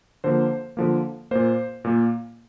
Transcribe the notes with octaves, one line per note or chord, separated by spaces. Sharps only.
D3 F3 A#3 C5
D3 F3 A#3
A#2 A#3 C5
A#2 A#3